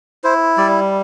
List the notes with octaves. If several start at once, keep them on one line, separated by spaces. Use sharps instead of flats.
E4 C5
G3 D5